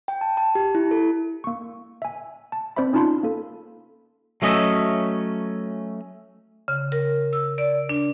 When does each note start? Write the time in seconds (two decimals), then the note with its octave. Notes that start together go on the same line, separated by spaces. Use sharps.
0.08 G5
0.21 A5
0.37 A5
0.55 G4
0.75 E4
0.91 A4
1.44 A#3 C#6
2.02 E5 G#5
2.52 A5
2.76 C4 C5 D5 E5 B5
2.93 C#4 D#4 F4 A5 B5 C6
3.23 A#3 A4
4.42 F#3 A3 C#4 D#5 E5
6.68 C#3
6.92 A#4
7.33 E6
7.58 D5
7.89 D4